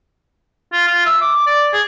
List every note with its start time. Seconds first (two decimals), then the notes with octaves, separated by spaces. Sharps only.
0.73 F4
0.87 F4
1.06 E5
1.21 D6
1.47 D5
1.73 G#4